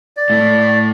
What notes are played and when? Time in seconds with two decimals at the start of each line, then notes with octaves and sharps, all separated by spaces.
0.17 D5
0.30 A2 A3